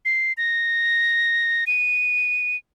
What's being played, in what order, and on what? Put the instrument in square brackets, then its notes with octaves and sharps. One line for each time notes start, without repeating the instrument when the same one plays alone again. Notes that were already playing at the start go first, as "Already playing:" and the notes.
[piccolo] C7
A#6
D#7